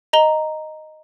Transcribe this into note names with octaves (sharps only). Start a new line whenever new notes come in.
D#5 A#5 G7